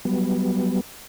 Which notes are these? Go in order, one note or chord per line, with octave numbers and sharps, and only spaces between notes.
F#3 G3 B3